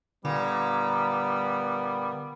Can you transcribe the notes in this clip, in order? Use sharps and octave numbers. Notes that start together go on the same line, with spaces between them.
A#2 D3 G3 B3